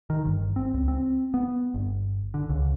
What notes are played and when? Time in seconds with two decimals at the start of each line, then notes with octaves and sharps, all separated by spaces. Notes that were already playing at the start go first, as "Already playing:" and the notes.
0.10 D#3
0.25 G1
0.56 C4
0.74 C#2
0.88 C4
1.34 B3
1.74 G1
2.34 D3
2.49 C#2